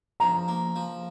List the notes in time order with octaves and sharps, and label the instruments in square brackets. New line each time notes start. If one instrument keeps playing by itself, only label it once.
[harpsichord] F3 [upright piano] A#5
[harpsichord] A#3
F3